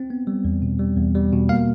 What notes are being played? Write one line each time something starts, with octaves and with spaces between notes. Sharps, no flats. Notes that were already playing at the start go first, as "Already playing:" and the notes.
Already playing: C4
B3
G3
E2
B2
G3
E2
G3
B2
A#3 F5